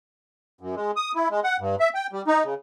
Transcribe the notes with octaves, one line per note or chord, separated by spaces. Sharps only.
F#2
G#3
D#6
E4
G#3
F#5
G2
E5
G5
G3
D#4
C#3